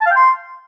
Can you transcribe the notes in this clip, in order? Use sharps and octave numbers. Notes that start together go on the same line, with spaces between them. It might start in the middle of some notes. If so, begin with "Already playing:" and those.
A5
F5
G5
C6